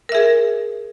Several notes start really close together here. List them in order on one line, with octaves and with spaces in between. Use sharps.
A#4 E5 G#4